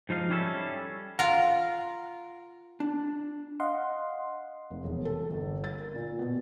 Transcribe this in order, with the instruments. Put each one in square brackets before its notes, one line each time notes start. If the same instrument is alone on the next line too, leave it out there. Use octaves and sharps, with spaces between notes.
[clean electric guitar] G#2 F3 D#4 F5
G3 C#4 E4 A4
[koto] F4 A#4 [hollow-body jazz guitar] F#5
[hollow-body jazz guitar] D4
[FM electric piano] D#5 F5 F#5 C6
[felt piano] F1
E1
A4
G1
A6
A#4
A#2
B2